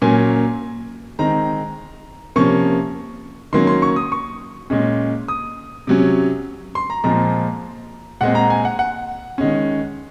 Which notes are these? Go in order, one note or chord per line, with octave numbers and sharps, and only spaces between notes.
A#2 F#3 A#3 C#4 G#5
D#3 G#3 C4 A#5
C3 F3 A#3 C#4 C#6
D#3 F#3 A#3 C#4 C6
C6
C#6
D#6
C#6
A#2 G#3 C#4
D#6
C3 F#3 C#4
C6
A#5
A#2 F3 G#3 C4 A#5
A#2 G#3 C4 F#5
A#5
G#5
F#5
F#5
D#3 G#3 C#4